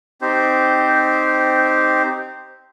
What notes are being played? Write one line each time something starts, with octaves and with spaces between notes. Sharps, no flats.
C4 D#4 G4 C5